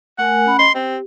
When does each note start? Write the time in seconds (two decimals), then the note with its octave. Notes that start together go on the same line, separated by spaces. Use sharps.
0.18 A3 A#4 F#5 G#5
0.46 C#4 B5
0.59 D#5 C6
0.75 C4 G4